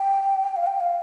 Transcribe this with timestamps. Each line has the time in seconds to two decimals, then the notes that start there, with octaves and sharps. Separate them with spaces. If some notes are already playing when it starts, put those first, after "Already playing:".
Already playing: G5
0.56 F5
0.67 G5
0.80 F5